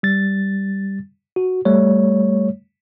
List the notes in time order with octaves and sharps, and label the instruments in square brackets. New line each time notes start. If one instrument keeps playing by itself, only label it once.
[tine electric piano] G3 A6
F#4
G3 A3 C#5